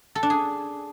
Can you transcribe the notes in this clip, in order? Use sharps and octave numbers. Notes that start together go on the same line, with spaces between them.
A4
D4
G#4